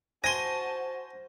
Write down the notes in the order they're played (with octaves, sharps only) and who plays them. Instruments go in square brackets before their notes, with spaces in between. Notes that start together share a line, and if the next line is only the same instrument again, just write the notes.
[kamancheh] F#4 A5 [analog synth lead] C5 [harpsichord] G#5 C6 [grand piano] A#6 D#7 G7